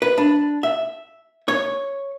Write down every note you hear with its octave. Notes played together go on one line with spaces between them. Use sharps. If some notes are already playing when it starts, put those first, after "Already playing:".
B4
D4
E5
C#5